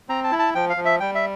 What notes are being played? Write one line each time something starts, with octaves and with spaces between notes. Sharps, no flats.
C4 A#5
A5
E4
A5
F3 G5
F5
F3
E5
G3 G5
E5